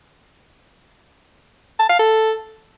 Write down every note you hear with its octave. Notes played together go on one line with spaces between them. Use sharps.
A5
F5
A4